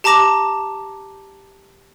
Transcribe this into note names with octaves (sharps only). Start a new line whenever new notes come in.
G4 A5 A#5 D6 A#6 E7